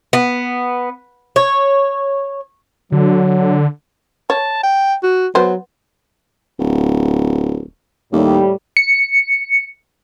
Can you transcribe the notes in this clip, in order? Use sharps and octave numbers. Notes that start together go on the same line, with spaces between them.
B3
C#5
D3 F#3
C#5 A5
G5
F#4
F#3 B3 C5
D1
D#2 A2 G3
C#7